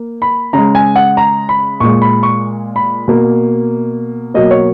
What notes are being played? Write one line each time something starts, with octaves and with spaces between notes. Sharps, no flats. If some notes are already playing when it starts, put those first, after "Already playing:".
Already playing: A#3
B5
C#3 G#3 A#5
G#5
F#5
A#5
B5
A#2 G#3 C#6
B5
C#6
B5
B2 A#3
B2 F#3 A#3 D#5
C#5